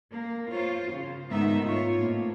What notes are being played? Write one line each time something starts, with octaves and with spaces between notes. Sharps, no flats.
A#3
F4 C5 C#5
C#3
G#2 D#3 A3 B3 D#4 E5
F4 C#5
A2 A#3 C4